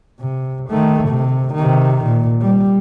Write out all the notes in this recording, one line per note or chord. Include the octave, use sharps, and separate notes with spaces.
C3
D#3 A3
C3
C3 D#3
A#2
G3